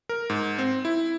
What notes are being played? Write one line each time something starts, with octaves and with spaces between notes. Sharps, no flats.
A#4
G#2
C4
E4